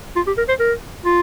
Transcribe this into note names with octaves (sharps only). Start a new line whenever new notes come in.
F4
G4
A#4
C5
A#4
F4